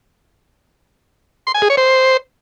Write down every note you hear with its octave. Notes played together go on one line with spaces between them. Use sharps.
C6
G#5
G#4
C#5
C5